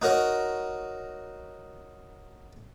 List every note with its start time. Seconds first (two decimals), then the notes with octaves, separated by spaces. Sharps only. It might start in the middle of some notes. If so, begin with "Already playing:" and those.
0.02 D#4 F#4 A#4 C#5 D#5